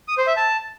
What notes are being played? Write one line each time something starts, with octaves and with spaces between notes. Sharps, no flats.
D#6
C5
E5
A5